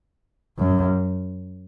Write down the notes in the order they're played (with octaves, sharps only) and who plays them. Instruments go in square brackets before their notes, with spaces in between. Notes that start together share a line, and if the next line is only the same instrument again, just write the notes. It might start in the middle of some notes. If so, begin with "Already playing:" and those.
[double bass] F#2